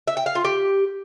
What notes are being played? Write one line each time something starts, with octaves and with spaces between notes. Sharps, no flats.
E5
G5
F5
F4
G4